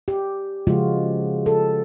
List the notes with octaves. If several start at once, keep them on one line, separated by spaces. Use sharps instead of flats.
G4
C#3 F3 G#3 F4 F#4
A4